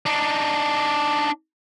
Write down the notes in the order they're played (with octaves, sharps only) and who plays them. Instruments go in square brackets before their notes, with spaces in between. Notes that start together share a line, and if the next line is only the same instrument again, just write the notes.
[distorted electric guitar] D4 D#4